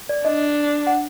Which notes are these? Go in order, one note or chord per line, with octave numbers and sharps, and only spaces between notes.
D5
D4 D#5
F#5